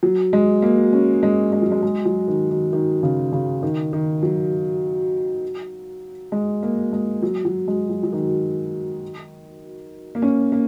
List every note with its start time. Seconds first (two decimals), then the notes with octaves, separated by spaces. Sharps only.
0.03 F#3
0.33 G#3
0.62 A#3
0.93 C#4
1.23 G#3
1.53 G#3
1.62 F#3
1.72 G#3
1.83 G#3
2.05 F#3
2.28 D#3
2.50 D#3
2.73 D#3
3.03 C#3
3.32 C#3
3.63 D#3
3.93 D#3
4.23 F#3
6.32 G#3
6.63 A#3
6.93 G#3
7.22 F#3
7.45 F#3
7.68 G#3
7.89 F#3
8.03 F#3
8.12 D#3
10.15 A#3
10.22 C#4
10.52 A#3